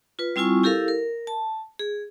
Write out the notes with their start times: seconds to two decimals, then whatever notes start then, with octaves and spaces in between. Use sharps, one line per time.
0.19 F4 B4
0.36 G3 C4 E4 F4 G#5 C#6
0.63 E4 G4 A4 A#4 F5
0.88 A#4
1.27 A5
1.79 G#4